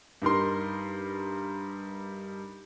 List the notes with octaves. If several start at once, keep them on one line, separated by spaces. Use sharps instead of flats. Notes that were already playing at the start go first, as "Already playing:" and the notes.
G2 D#4 A#4 C6